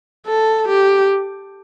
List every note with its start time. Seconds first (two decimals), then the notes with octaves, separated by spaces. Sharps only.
0.27 A4
0.68 G4